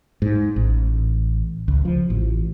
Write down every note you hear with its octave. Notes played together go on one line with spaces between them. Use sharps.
G#2
A1
C#2
F3
A1